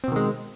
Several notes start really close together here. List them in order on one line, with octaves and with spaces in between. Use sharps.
C4 B2 D#3 G#3